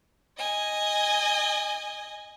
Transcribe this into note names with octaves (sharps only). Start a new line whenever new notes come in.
D#5 G#5